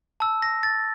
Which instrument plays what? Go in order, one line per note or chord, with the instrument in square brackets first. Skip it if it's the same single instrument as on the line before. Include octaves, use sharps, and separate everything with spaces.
[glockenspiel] A5 E6
A#6
A6